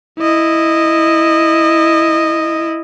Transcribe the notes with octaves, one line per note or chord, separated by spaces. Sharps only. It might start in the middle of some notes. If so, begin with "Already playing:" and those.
E4 D#5